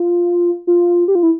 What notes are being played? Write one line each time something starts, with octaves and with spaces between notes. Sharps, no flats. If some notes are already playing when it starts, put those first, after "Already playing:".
Already playing: F4
F4
G4
F4
E4